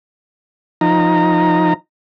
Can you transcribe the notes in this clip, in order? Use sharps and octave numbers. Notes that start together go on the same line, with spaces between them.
F3 D#4 A#5